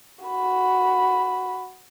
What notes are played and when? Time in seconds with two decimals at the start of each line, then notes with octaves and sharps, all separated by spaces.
0.25 F#4 B5